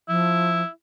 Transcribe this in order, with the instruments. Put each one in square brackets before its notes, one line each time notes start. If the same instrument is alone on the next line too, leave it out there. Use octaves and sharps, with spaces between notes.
[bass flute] F3 [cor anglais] E4